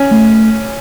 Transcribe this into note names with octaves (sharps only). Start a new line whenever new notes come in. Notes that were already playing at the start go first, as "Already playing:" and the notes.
Already playing: C#4
A3